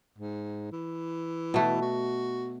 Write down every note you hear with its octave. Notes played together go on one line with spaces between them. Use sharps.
G#2
E3
B2 A3
F#4